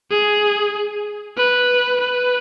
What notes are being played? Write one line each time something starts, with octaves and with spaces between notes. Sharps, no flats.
G#4
B4
B4